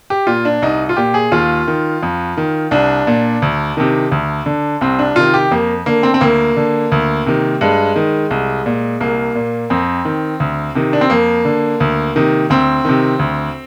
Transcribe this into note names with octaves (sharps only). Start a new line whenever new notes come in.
G4
A#2 F4
D4
C2 D#4
F4
A#2 G4
G#4
D#2 F4
D#3
F2
D#3
C2 D4
A#2
D2
C3 D#3
D2
D3
C2 C4
D4
C3 D#3 F4
G4
F2 A#3
D3 A#3
C4
C4
D2 A#3
D3
D2
C3 D#3
G2 G#3
D#3
C2
A#2
C2 A#3
A#2
F2 C4
D#3
D2
C3 D#3
D4
C4
F2 A#3
D3
D2
C3 D#3
D2 C4
C3 D#3
D2